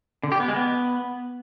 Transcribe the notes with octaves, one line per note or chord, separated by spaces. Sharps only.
D3
G4
B3
G#3
B3